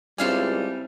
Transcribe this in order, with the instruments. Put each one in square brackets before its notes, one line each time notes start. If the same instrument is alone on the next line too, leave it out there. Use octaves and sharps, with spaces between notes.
[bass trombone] C#2 [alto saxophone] G3 [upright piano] C4 E4 F7 [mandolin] A4 F5 G#5